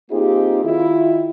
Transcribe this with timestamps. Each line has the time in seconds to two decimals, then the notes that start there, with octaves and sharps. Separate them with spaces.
0.11 A#3 C4 D#4 F4 G4 G#4
0.64 D#3 E4 F4